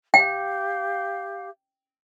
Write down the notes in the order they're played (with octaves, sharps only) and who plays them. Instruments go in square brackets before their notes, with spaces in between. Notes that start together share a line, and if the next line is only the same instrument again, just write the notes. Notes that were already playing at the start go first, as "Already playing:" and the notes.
[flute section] G4 F5 [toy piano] G5